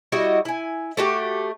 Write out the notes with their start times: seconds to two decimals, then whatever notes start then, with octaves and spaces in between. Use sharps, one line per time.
0.12 G3 E4 F#4 D#5
0.45 E4 G#5
0.97 A3 F#4 G4